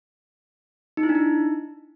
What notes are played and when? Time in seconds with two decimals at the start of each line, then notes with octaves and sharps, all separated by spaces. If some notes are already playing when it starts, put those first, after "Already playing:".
0.97 D#4
1.03 E4
1.09 D4
1.15 D#4